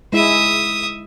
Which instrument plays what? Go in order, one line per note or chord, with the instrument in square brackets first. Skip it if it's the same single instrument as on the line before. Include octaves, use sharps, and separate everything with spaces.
[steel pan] G#3 E4 [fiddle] E5 D#6